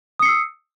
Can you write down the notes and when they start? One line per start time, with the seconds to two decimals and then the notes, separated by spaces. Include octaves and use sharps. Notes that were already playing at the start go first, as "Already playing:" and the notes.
0.19 D#6
0.22 C#7
0.25 C7
0.28 E6